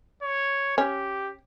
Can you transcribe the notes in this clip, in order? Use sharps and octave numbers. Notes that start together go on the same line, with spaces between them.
C#5
C#4 G4